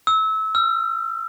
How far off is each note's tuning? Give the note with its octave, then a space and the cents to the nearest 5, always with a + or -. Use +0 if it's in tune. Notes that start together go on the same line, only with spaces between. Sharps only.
E6 -25
E6 +45